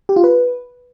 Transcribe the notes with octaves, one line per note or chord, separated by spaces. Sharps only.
G4
F4
B4